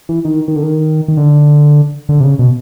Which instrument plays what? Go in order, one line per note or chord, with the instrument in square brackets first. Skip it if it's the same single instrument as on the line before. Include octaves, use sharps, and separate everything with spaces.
[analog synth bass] E3
D#3
D#3
D3
D#3
D#3
D3
D3
C3
C#3
B2